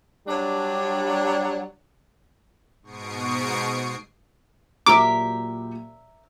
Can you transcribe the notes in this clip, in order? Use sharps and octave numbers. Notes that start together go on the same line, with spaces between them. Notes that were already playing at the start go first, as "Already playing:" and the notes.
F#3 G3 D4
G#2 B2 C#6 D#6 C7 D7
A#2 F#3 G4 A#4 E5 D6